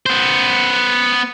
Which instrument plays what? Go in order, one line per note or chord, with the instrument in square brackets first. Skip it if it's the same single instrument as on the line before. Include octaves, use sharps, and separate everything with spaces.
[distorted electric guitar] B3 C5